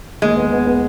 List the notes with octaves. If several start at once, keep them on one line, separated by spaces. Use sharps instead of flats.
D#2 G#3
B3
B3
B3